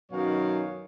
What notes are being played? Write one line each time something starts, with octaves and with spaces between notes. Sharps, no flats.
F#2 B2 D#3 F#4 C#5 F5